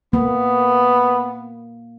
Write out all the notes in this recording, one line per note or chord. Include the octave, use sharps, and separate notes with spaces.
A#3 B3